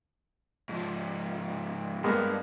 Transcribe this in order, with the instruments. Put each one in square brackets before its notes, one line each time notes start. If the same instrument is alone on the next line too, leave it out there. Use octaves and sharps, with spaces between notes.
[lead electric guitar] G#2 F3
[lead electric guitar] G2 [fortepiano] G#3 A#3 B3